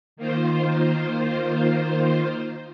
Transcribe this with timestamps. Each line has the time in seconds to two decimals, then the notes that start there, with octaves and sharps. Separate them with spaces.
0.17 D#3 A#3 F4 C5